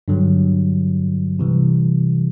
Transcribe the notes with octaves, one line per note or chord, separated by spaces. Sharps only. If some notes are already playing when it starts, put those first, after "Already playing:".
G2 D3 F#3
C3 E3 G3